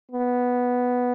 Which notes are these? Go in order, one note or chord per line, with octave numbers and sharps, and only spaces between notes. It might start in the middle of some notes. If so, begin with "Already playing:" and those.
B3